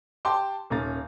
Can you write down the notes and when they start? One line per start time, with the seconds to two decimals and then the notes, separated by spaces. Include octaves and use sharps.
0.25 G4 G5 A5 C6 D6
0.70 D#1 A#3 C#4 A#5 A6